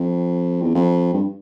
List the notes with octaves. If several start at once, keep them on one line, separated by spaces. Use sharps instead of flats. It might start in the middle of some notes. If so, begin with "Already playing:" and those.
Already playing: F2
E2
F2
G2